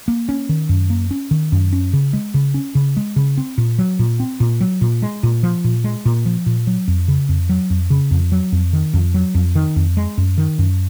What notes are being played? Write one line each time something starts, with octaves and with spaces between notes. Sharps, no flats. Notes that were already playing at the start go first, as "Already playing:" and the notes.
A#3
C#4
D#3
F#2
A#3
C#4
D#3
F#2
C#4
C#3
G#3
C#3
C#4
C#3
G#3
C#3
C4
A#2
F#3
A#2
C4
A#2
F#3
A#2
G#3
A#2
F3
A#2
G#3
A#2
F3
A#2
F#3
F2
C#3
F2
F#3
F2
C#3
F2
F#3
F2
D#3
F2
F#3
F2
D#3
F2
G#3
F#2
D#3
F#2